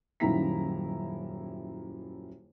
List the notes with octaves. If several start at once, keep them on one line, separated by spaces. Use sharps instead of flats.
D#1 F#2 D#3 E4 A#5 B6